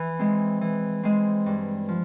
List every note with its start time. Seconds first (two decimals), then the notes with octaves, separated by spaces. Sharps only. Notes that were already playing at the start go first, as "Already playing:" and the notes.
Already playing: E3
0.19 G#3 C4
0.61 E3
1.03 G#3 C4
1.46 G2
1.89 F3